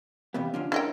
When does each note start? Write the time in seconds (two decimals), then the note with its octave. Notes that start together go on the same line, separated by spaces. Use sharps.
0.34 E2 C3 B3 G4 F5
0.54 D3 F3 C#4 D4
0.72 E4 A#4 C#5 D#5 G5